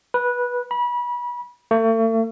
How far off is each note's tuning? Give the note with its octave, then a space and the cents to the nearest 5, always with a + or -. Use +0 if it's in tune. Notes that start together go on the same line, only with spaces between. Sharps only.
B4 -15
B5 -30
A3 +40